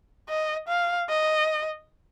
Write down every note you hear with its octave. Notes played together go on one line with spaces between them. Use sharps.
D#5
F5
D#5